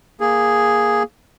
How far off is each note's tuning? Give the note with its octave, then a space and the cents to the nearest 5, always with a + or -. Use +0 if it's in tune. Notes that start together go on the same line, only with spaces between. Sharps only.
A#3 +0 G#4 +0